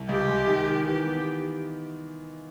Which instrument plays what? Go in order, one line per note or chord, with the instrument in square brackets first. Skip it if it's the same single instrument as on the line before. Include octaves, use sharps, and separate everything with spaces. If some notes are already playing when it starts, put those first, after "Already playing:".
Already playing: [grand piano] C2
[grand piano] C#2 [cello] G4
[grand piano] G#3
D#3
D#3
[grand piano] E3 [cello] G4
[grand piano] B3